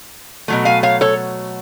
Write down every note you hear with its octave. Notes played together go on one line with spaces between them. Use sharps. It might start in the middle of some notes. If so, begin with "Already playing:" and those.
B2 F#3 A3
F5 G#5
C#5 F5
A4 C#5